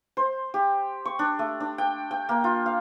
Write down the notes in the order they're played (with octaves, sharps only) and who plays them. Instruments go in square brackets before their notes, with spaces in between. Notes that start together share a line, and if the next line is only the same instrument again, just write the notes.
[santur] C5
G4
C#6
D4
A3
D4
G5
G5
A#3
F4
F5